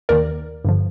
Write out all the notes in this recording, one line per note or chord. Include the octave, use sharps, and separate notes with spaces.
D#2 D#3 A#4 D5
G2 D3 F3